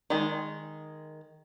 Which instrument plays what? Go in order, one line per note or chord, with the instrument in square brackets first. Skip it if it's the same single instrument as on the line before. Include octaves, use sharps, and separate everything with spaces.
[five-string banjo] D#3 G#3